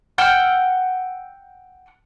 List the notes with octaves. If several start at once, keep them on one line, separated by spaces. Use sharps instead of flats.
F#5 G5 E6 F6